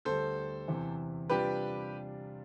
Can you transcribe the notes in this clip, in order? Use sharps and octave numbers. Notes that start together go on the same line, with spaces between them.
D2 D3 G3 A4 C5
E2 C3 E3
C3 G3 D4 F4 G4 B4